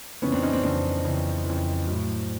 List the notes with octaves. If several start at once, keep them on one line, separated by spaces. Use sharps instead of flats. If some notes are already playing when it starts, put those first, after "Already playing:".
F2 C#3 E3 B3 C#4
C4 D4
C#4 D#4
C4 D4
F2 C#3 E3 C4 D4
F2 C#3 E3
F2 C#3 E3
A2 F#3